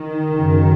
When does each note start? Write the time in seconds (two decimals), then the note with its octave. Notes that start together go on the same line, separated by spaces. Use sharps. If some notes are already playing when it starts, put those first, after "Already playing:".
Already playing: D#3
0.32 F#2 C#3